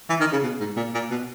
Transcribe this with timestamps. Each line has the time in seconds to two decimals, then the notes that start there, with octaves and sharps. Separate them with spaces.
0.10 E3
0.20 D#3
0.32 C#3
0.43 B2
0.60 G#2
0.77 A#2
0.94 A#2
1.11 B2